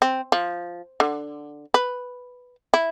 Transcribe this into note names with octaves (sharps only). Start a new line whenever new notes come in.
C4
F3
D3
B4
E4